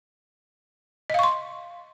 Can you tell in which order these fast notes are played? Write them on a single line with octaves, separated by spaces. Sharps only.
D#5 F5 C#6 C6